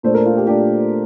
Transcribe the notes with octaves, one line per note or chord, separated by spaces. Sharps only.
A#2 A3 D4 C5
A#4
F4
G4
A#2 A3 D4 G4